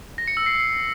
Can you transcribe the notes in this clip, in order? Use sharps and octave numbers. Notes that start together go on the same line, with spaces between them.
A#6
C#7
E6
C7